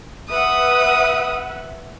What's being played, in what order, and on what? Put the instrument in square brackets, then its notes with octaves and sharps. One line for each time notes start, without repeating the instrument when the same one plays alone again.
[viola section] B4 E5 F#5 [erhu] D#6